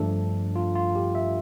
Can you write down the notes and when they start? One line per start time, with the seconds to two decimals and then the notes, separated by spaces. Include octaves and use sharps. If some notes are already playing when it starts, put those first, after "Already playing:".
Already playing: G2 F3 A3 D4 A4
0.56 F4
0.75 F4
0.95 G4
1.15 E5